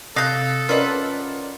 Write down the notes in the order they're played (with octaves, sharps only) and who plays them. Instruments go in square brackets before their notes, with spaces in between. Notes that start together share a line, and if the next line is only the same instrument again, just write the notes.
[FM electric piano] C3 [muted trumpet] A4 [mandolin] F5 G6 [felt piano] D#6 F#6 A#6
[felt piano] C#4 [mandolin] F4 B4 F#5 [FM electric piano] A#4 D5 D#5